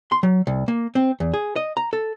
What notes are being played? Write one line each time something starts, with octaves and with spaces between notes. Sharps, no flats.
C6
F#3
C2
A#3
C4
E2
G#4
D#5
A#5
A4